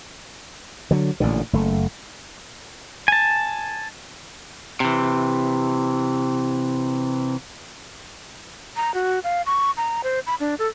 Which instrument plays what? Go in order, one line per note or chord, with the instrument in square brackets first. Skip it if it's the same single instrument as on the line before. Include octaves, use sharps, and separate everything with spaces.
[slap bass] D3 F#3
A1 A#2 D3
F#1 A3
[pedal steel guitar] G#5 A5
[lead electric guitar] C3 E3
[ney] A#5
F#4
F5
C#6
A#5
C5
B5
D4
A4